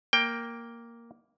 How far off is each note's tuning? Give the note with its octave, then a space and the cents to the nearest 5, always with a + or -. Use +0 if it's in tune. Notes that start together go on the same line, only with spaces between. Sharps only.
A#3 +0 G5 +10